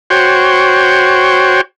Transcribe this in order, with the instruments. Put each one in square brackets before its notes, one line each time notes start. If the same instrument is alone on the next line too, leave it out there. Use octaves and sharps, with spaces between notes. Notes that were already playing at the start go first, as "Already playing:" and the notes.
[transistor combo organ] F#4 C5 C#5 G5